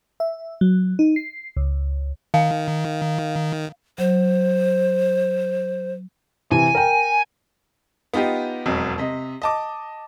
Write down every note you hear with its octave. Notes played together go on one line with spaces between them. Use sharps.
E5
F#3
D#4
C7
C#2
D#3 F5
F#3 C5
C3 E3 G#5
A#4 G5
B3 D#4 F4 G4
E1 F2 F#3
C3 D#5
D#5 A5 D6